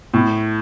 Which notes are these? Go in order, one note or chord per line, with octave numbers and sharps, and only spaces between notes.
A2